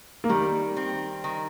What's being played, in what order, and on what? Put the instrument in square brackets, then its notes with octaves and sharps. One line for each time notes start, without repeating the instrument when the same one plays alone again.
[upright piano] A#3
[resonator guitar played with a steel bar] D#3 [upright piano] G3
[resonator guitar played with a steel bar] C4
D#3